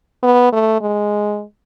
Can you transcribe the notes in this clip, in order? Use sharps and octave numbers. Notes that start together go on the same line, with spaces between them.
B3
A3
G#3